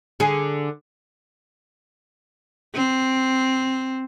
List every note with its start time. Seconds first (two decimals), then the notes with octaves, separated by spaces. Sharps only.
0.20 D3 G#4
2.74 C4